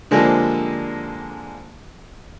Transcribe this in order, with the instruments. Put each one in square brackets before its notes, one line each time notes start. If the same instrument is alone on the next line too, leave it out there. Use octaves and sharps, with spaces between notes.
[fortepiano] D3 F3 G3 G#3 A#3 C4